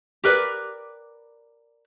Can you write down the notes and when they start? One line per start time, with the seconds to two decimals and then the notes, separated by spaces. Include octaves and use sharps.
0.24 G4 A#4 B4 D5